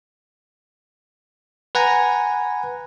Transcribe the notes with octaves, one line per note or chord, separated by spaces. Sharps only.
B4 F#5 G#5 A#5